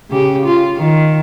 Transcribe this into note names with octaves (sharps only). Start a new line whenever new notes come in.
C#3 G4
F4
D#3